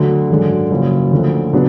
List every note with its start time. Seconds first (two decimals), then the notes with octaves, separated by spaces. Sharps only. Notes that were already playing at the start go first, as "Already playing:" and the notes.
Already playing: D2 D3 F#3
0.29 G#1 F#2 D3 G#3
0.71 F#1 F#2 F3
1.12 D2 D3 F3
1.53 C#3 F#3 B3 D4